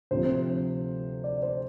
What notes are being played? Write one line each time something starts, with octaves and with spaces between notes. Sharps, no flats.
D2 C3 F3 C5
D5
C5